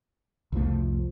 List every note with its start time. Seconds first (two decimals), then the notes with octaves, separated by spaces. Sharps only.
0.52 C2 F2 F3 A3